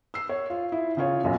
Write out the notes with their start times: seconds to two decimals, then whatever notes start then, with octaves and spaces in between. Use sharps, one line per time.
0.14 E6 C7
0.29 C#5
0.50 F4
0.72 E4
0.97 C#3 F4 C#5
1.24 B1 F#2 A#2